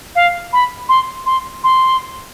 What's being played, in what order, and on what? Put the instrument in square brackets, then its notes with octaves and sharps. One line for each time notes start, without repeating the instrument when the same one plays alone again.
[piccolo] F5
B5
C6
C6
C6